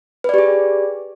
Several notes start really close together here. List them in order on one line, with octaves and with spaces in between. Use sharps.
B4 D5 G4 G#4